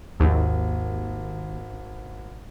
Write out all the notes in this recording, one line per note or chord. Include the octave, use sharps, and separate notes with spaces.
G#1 D#2